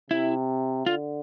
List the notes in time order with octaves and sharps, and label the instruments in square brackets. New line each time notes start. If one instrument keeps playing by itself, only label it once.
[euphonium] C3 [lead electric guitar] E4
[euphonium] D3 [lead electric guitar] F4